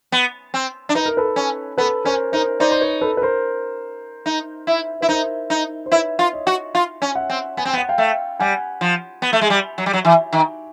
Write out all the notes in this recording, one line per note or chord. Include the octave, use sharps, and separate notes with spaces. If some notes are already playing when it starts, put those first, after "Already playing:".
B3
C4
D4
D#4 B4
A#4
A4 B4
C#4
B3 A4 B4
C#4 A#4 C5
D#4 A#4 C5
D#4 C5 D5
C5
B4 C#5
A4 B4
B4
A#4 C5
D#4
E4
E4 B4
D#4 A#4 C5
D#4
C5
E4 B4 C#5
F4
C#5 D#5
F#4
F4
C#4
E5 F#5
C4
B3 G#5
C4 G5
B3
F#5
F5 G5
A3
G3 F#5 G#5
F3
B3
A3
G#3
G3
F#3
G3
F#3
E3
D#3